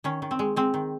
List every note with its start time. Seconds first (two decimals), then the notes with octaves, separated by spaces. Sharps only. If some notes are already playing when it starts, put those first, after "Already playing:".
0.04 D#3 C#4
0.22 D#3
0.31 C4
0.39 G#3
0.56 G#3 C4
0.74 D#3